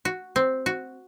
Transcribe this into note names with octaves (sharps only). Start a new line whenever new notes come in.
F#4
C4
F#4